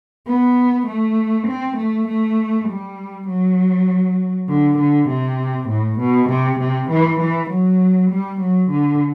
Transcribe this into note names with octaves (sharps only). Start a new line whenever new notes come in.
B3
A3
C4
A3
A3
G3
F#3
D3
D3
C3
A2
B2
C3
C3
E3
E3
F#3
G3
F#3
D3